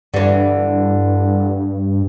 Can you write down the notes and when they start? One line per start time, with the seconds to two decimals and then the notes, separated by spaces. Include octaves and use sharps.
0.14 G2 D3 E3